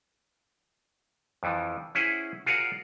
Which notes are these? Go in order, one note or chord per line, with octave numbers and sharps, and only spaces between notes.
F2 E3 F3
C#4 E4 G#4 C5 F#5
F4 F#4 G#4 A#4 C#5 F#5